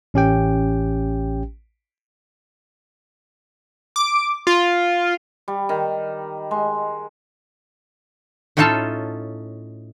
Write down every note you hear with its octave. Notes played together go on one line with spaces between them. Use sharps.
A1 C#4 G4 G5
D6
F4
G3
D#3
G#3
A2 C#4 D#4 F4 A4 A5